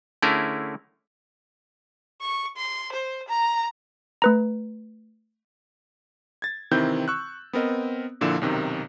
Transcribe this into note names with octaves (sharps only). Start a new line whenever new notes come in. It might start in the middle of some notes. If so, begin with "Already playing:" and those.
D3 A3 C#4 E4 G#4 A#4
C#6
C6
C5
A#5
A3 B4 A#5
G#6 A6
C3 D#3 E3 C4 E4 G6
C#6 E6 F#6
B3 C4 A#4 D#5
A#1 A#2 D3 F3 E4 E7
B1 F#2 C3 D#3